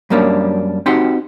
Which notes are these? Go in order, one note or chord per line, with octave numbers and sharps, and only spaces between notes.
F#2 G3 A#3 C#4 D4
C4 D#4 F#4 G4 F#5 C6